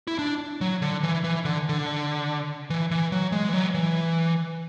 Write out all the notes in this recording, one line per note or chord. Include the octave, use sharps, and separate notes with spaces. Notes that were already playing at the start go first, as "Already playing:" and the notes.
E4
D4
F#3
D3
E3
E3
D3
D3
E3
E3
F#3
G#3
E3
F#3
E3